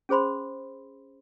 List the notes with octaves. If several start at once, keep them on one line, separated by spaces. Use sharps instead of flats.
C#4 G#4 C5 B5 C6